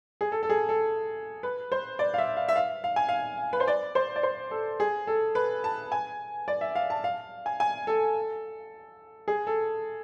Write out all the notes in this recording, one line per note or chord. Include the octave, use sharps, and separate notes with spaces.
G#4
A4
A4
G#4
A4
B4
C5
D5
F5
E5
F5
E5
F5
F5
G#5
F5
B4
C5
D5
C5
D5
C5
A4
G#4
A4
B4
A5
G#5
D5
E5
F5
A5
F5
G#5
G#5
A4
G#4
A4